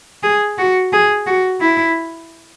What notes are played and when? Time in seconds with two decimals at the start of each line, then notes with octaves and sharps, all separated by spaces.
0.23 G#4
0.58 F#4
0.93 G#4
1.27 F#4
1.61 E4